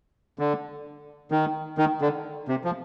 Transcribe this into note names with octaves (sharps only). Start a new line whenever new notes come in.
D3
D#3
D#3
D3
C3
F3